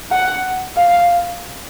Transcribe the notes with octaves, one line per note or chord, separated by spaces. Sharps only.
F#5
F5